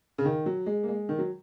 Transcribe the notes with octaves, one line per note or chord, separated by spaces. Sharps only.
C#3
D#3
F#3
G#3
A#3
G#3
D#3
F#3